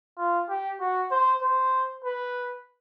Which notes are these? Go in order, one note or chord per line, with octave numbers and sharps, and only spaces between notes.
F4
G4
F#4
C5
C5
B4